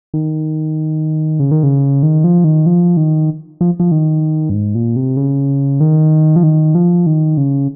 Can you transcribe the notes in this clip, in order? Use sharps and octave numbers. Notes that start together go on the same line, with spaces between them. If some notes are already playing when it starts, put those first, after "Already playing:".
D#3
C#3
D#3
C#3
D#3
F3
D#3
F3
D#3
F3
F3
D#3
G2
G#2
A#2
C3
C#3
D#3
F3
D#3
F3
D#3
C#3